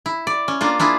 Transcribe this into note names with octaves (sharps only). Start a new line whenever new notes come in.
E4
D5
C#4
A#3 D4 F4
D4 E4 F4 G#4